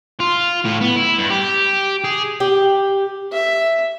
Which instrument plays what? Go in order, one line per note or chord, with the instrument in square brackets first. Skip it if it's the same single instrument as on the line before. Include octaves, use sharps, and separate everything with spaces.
[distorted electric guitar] F4
A2
B3
E4
G2
G4
G#4
[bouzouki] G4
[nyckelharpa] E5